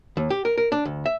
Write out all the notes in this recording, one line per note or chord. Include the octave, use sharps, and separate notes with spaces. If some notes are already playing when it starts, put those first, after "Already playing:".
D#2
G4
A#4
A#4
D4
D2
E5